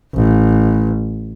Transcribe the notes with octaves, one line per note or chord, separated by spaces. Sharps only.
A1